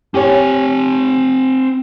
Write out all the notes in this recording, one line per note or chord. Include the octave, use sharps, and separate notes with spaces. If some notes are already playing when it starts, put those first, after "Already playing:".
C4 G4 C#5 G#5